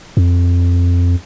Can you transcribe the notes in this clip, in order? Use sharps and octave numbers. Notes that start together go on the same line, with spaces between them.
F2